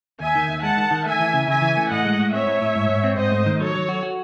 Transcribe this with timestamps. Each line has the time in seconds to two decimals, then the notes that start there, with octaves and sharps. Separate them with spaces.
0.20 D#2 E5 G#5
0.35 D#3
0.49 D#2
0.63 G#3 F#5 A5
0.77 D#3
0.91 D#3
1.06 A3 E5 G#5
1.20 E3
1.33 C#3
1.48 C#3 E5 G#5
1.62 E3
1.77 A3
1.90 A2 D#5 F#5
2.05 G#3
2.20 A2
2.33 C4 C#5 E5
2.47 A2
2.61 A2
2.76 G#2
2.89 G#2
3.04 C4
3.18 G#2 C5 D#5
3.32 A3
3.46 D#3
3.60 F#3 A4 C#5
3.75 F#3
3.89 F#4
4.03 F#4